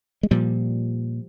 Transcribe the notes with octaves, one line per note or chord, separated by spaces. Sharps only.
G#3
A#2 F3 G3